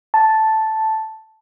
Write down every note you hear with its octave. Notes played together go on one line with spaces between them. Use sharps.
A5